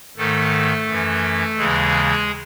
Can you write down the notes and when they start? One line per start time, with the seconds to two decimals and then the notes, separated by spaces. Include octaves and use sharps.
0.17 G#2 D#3 A3 A4
0.87 F#2 E3
1.57 D#2 C#3 E3 G#3 G#4